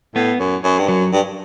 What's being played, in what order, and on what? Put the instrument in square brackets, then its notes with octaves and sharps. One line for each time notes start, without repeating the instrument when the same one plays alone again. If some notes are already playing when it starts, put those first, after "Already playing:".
[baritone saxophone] A2 [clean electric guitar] B3
[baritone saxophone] F#2
F#2
G2
[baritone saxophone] F#2 [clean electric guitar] F#3
[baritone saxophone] G2